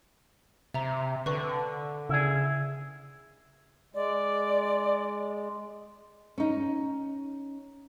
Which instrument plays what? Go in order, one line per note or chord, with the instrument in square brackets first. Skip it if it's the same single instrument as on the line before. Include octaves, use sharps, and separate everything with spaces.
[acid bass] C3 [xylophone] E5 A#5
[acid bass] D3 [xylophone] B4 C#6
[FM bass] C#3 [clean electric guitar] E4 G#4
[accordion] G#3 [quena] D5
[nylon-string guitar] C#4 D#4